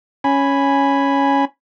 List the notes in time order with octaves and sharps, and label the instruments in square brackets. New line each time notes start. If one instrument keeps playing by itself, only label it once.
[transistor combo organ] C#4 G#5 B5